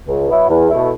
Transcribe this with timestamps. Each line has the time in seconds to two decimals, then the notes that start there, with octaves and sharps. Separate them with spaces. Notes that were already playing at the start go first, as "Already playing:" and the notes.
0.08 C#2
0.28 B2 F#3 B3 E4
0.49 E2
0.70 B2 A3 E4